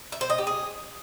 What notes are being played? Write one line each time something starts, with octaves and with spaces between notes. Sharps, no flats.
E5
C5
D#5
G4
G#4